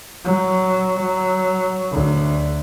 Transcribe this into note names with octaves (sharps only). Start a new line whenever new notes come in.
F#3
F#3
D2